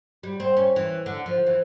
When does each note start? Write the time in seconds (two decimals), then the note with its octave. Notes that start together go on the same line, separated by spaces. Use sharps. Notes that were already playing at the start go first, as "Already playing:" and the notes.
0.23 G3
0.40 C4
0.57 C#4
0.76 E3
1.06 D3
1.26 F3
1.46 E3